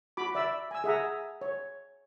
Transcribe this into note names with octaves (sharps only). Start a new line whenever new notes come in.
F#4 B5 D6
D5 E5 B5 E6
G#5 E6
G#4 E5 F#5 A#5
C#5